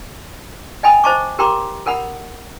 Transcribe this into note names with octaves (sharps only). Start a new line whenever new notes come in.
D#5 G5 G#5 B5 D#6
C5 D#5 A5 C#6 D6
G4 A#4 G5 A#5 C6 D6
A4 A#4 F#5 B5